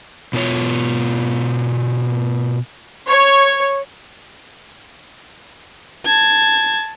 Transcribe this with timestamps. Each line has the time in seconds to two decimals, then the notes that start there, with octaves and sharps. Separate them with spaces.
0.33 B2 B3 F4 C#5
3.08 C#5
6.06 A5 G#6